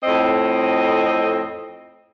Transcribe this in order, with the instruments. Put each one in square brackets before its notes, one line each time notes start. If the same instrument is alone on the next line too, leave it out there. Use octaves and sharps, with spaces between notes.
[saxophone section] F2 A2 C4 D#5